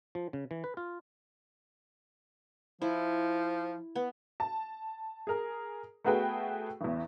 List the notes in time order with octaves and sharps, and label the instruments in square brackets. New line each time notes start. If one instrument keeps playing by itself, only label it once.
[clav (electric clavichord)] F3
C#3
E3
B4
F4
[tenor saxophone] F3 [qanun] E4
[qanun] B3
[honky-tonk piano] A5
G#4 A#4
A3 B3 F#4 G#4 B4 G5
A1 E2